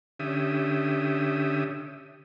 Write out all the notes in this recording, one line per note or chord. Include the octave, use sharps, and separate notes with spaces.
D3 C#4 G4 E5 D#6